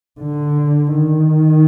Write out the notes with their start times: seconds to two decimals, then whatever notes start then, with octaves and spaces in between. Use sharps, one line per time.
0.21 D3
0.94 D#3